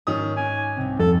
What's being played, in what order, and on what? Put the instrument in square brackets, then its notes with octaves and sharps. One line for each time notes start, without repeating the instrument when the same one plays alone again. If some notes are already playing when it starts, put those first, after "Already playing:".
[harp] G#2 [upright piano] D#3 C#4 D#6
[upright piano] C#4 [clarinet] G#5 [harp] D6 F#6
[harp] C2 C3 [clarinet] C4
[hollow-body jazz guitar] F2 [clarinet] A4